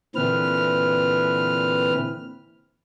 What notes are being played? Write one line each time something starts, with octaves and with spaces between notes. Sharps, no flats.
A#2 D3 E3 C4 B4 F6